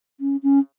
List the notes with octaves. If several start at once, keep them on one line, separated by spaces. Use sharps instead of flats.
C#4
C#4